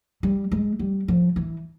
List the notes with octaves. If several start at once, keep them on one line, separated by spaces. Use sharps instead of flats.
G3
G#3
G3
F3
E3